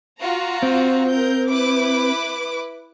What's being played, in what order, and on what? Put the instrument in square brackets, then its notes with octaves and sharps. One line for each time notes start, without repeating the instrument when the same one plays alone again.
[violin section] F4 F#4 A#5
[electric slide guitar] C4
[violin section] A#4 G6
E4 B4 D6